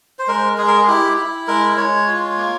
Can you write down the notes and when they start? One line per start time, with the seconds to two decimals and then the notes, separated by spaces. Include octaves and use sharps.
0.19 C5
0.28 G#3 A#4
0.58 G#3 G#4
0.67 A#4
0.76 G#4
0.88 E4 G4
1.17 E4
1.48 G#3 A#4
1.77 G#3 C#5
2.07 F4
2.38 A#3